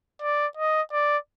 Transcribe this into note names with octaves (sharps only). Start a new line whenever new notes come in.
D5
D#5
D5